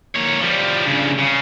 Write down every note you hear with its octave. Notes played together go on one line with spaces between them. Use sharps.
A#3 C#5
F3 G3
G2 C#3
C#3